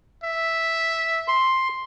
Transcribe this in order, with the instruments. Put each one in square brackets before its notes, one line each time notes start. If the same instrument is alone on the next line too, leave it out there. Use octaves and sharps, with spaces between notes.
[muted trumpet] E5
[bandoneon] C6